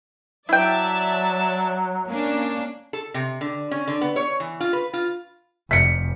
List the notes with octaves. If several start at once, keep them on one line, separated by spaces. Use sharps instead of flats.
F#3 E4 D5 E5 G5 A5
A#3 C#4 D4
A4
C3
D3
C#4
D3
B3
C#5
E3
F4
B4
F4
F1 B6 C#7